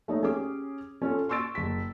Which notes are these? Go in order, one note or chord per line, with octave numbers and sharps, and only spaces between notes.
A3 D#4 C#5
C#4 G4 G#4 D6
C#4 F4 A4
C6 C#6 E6 A6 D7
F#1 B6